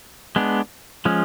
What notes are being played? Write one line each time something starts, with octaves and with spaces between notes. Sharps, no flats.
G#3 B3 D4
F3 G#3 C#4